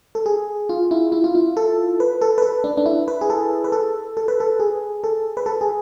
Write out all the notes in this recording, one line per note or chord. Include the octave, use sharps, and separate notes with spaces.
A4
G#4
F4
E4
E4
F4
E4
A4
B4
A4
B4
A4
D4
D4
E4
B4
G#4
A4
B4
A4
A4
B4
A4
G#4
A4
B4
A4
G#4